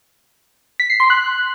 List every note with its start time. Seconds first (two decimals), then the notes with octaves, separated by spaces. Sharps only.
0.80 B6
0.90 C7
1.00 C6
1.10 F#6